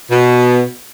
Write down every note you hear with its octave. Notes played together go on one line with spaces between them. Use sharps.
B2